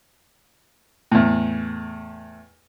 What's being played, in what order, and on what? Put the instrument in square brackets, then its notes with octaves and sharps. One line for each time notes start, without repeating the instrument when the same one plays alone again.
[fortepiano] E2 A2